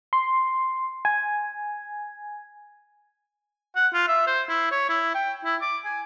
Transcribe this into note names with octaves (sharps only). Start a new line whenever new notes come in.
C6
G#5
F#5
F4
E5
C5
E4
C#5
E4
G5
E4
D6
G#5